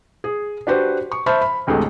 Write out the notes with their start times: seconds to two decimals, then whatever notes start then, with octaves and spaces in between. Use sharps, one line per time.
0.24 G#4
0.67 D4 F#4 G4 B4 C5
1.12 C#6
1.26 C5 E5 A5 B5 C#6 F6
1.42 B5
1.67 A1 D2 C3 G#3 A3